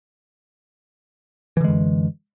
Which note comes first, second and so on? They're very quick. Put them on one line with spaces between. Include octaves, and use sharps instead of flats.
E3 D3 G#3 F#2